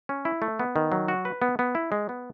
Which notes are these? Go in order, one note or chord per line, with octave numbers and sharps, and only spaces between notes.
C#4
E4
A3
B3
D#3
F#3
F#4
B4
B3
B3
E4
G#3
B3